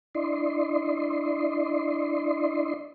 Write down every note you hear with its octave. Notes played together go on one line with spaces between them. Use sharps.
D4 E4 D5 D#5 C6